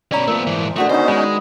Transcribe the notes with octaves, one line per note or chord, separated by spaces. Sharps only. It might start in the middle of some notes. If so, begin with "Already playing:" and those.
B2 C#4 D5 A#5 B5
A#2 F3 A3 B3 A#4
G#2 E3
D3 A3 F#4 D#5
D#3 B3 C#4 D#4 C5 D#5
G#3 B4